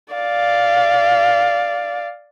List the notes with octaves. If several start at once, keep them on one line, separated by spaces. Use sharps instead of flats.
D5 F5